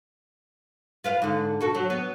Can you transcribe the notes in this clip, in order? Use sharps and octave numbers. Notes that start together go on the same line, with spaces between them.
F4 B4 F5
G#2 D3
B2 F#4 A4
F#3
B3